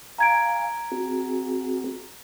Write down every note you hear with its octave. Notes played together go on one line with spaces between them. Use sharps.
F5 G#5 A#5 G#6 D7
C4 F#4 G#4